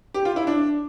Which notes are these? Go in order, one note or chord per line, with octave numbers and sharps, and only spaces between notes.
G4
F4
E4
D4